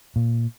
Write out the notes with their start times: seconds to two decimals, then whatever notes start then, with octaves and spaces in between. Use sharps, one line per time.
0.16 A#2